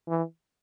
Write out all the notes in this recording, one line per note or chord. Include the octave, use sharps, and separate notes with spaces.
E3